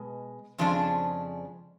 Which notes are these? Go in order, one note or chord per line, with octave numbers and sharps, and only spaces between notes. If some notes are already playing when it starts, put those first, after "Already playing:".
Already playing: B2 G#3
F2 C#3 F3 G#3 D4